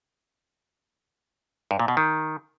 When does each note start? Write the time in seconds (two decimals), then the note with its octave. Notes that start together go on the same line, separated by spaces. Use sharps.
1.71 G2
1.79 A#2
1.88 B2
1.97 D#3